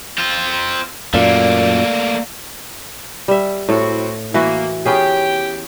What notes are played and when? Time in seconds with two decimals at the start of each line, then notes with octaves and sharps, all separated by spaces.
0.18 C4 F4
1.14 F#2 A#2 A3 A#3 D5 F5
3.28 G3 E5
3.69 A2 C4 E4 F#4 A4
4.34 E3 A#3 E4 F#4
4.85 B3 C#4 G4 G#4 G5